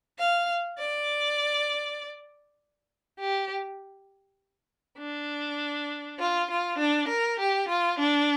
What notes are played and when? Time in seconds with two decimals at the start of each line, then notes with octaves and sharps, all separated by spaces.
0.18 F5
0.78 D5
3.19 G4
4.98 D4
6.19 F4
6.49 F4
6.78 D4
7.09 A#4
7.38 G4
7.69 F4
7.99 D4